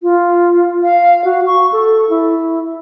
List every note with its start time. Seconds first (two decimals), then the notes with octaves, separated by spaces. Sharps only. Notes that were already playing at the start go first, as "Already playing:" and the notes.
0.02 F4
0.83 F5
1.25 F#4
1.46 C#6
1.72 A4
2.10 E4